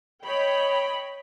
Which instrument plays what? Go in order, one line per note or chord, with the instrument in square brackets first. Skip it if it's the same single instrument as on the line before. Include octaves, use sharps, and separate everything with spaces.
[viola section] C#5 D#5 G5 B5